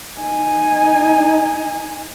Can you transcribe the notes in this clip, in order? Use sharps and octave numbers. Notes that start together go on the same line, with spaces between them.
D#4 G#5